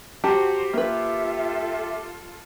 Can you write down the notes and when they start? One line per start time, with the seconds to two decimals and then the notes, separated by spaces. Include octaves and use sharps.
0.24 F#4 G4 C5 F#5 A5 A#5
0.74 A#3 F4 A4 B4 E5